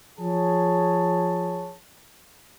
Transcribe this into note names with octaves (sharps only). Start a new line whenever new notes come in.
F3 G#4 C#5 A5